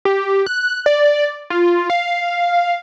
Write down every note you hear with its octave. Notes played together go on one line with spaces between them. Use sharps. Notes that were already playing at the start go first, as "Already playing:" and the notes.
G4
F#6
D5
F4
F5
F5